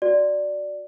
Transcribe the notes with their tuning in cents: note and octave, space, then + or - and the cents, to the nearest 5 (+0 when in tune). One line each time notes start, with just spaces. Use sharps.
F#4 +0 D5 +0